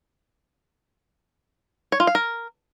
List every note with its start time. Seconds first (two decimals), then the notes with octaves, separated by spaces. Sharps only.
1.92 C#5
2.00 F4
2.07 F5
2.15 A#4